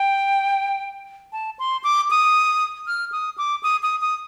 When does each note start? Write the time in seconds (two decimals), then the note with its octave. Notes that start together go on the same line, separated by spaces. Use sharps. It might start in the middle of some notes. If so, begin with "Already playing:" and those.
Already playing: G5
1.33 A5
1.59 C6
1.84 D6
2.10 D#6
2.87 F6
3.12 D#6
3.38 D6
3.63 D#6
3.83 D#6
4.01 D#6